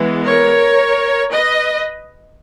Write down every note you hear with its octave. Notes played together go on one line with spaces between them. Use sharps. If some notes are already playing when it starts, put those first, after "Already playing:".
Already playing: E3 G#3 B3
A#4 C#5
B4 D#5